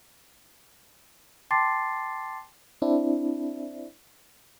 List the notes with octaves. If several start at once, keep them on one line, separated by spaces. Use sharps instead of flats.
G5 A5 C6 D6 A6 C7
C4 D4 E4